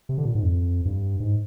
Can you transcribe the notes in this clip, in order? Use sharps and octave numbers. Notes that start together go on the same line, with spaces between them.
C3
D3
A#2
G#2
F2
G2
G#2